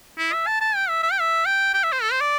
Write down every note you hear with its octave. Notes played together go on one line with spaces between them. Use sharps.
E4
E5
A5
A5
G5
E5
E5
G5
E5
G5
G5
E5
C5
A4
C5
D5